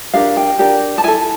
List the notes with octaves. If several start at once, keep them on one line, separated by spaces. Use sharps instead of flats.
D4 G4 A#4 F5
G5
D4 G4 A#4
A5
E4 A4 G#5